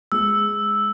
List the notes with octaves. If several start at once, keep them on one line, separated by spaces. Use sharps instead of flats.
G#3 E6